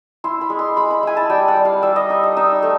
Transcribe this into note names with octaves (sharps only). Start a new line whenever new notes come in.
E4 C6
B5
G#3
C6
G#3 B5
B5
E4 G#5
A5
G3 G5
F#5
G3
F5
G3 E5
D#5
D#4 E5
D#5
D#4 E5
A3